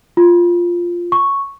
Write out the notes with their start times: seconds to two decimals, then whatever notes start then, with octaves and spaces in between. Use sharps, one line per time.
0.17 F4
1.12 C#6